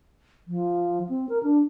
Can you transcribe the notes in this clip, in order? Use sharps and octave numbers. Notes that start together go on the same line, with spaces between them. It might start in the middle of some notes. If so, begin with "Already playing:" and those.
F3
C4
A#4
D4